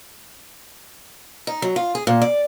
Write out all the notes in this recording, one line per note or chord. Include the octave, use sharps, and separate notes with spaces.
D#4
F#3
F4
G#4
A#2
D5